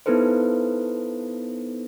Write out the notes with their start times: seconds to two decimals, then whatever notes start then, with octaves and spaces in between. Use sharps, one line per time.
0.06 B3 D#4 E4 A4 B4 C5